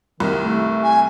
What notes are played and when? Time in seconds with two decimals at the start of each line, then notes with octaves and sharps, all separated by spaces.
0.20 C2 D#3
0.42 A3
0.83 G#5